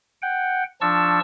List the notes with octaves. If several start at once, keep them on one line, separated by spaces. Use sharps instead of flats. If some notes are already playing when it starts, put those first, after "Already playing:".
F#5 G5
F3 D4 A5 C#6 E6